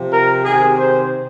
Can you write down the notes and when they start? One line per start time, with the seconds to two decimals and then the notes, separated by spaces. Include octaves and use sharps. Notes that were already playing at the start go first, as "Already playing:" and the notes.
Already playing: C3 F3
0.12 A#4
0.44 C3 D#3 G#4
0.77 C5